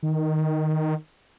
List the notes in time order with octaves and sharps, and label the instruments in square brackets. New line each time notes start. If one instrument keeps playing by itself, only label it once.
[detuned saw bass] D#3